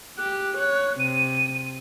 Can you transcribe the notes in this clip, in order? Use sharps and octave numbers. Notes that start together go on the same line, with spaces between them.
G4 F#6
C#5
C3 D#7